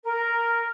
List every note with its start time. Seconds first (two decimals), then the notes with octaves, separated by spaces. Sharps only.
0.04 A#4